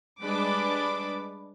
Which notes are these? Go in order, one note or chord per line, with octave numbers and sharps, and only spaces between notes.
G3 G#3 D4 B4 D6